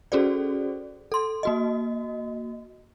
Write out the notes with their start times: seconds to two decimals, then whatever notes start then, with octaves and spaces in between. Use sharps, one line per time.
0.12 C#4 F#4 G#4 A4 C5 D5
1.12 A4 C6
1.43 A#3 F#4 D#5